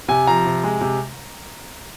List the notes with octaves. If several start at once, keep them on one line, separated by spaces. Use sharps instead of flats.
C3 G#5
F3 A#5
C3
G#3
C3